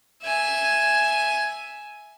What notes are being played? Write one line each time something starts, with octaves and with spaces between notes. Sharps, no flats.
E5 G#5